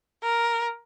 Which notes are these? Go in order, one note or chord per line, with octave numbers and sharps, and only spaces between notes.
A#4